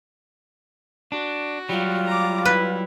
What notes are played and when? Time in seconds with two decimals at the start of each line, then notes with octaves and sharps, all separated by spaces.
1.12 D4 F#4
1.69 F#3 G3 F4
2.07 A#5 D6
2.45 E4 B4